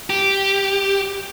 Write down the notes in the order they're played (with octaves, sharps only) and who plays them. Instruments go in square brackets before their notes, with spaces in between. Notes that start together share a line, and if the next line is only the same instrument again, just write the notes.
[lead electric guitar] G4